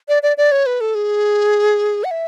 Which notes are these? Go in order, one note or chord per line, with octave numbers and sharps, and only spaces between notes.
D5
D5
D5
C#5
B4
A4
G#4
F#5
E5